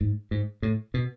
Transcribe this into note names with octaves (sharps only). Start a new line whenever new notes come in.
G#2
G#2
A2
B2